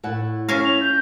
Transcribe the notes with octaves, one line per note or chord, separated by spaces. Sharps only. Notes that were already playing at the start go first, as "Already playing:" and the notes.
A2 E4 F#5
C#4 E5 F5 A#6
F7
G6